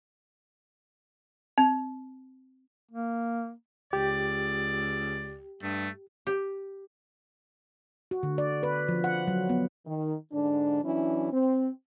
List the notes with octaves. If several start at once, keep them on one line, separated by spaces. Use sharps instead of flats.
C4
A#3
C#2 G4 D5
G2 A3
G4
F#4
D3
D5
B4
F3
F#5
F#3
B3
D#3
G#2 D3 D4
E3 F#3 C#4 D4 E4
C4